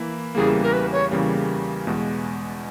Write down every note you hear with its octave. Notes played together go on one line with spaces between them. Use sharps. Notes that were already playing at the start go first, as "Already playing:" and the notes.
Already playing: E3 A#3 E4
E2 C#3 E3 G3 A#3 G#4
A#4
B4
C#5
E2 C#3 E3 G3 A#3
E2 B2 G#3